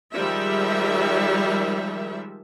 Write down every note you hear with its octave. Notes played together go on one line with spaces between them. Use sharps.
D#3 F3 G3 G#3 E5